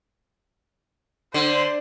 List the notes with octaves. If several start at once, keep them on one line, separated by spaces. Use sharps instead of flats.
D3 C5